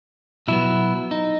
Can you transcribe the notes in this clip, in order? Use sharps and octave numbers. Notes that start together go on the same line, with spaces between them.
B2 F#3 B3 E4
D#4